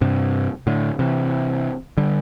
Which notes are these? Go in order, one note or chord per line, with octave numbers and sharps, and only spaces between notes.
G2 C3
A2 D3
C3 E3
D3 G3